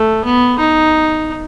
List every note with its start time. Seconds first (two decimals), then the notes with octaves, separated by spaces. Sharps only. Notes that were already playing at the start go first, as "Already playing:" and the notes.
Already playing: A3
0.25 B3
0.59 D#4